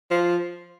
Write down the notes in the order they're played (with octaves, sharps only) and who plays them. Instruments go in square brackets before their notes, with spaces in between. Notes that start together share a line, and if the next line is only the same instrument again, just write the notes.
[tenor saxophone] F3